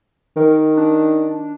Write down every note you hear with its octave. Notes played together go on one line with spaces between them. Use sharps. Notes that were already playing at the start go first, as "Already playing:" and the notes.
D#3 A#4
D4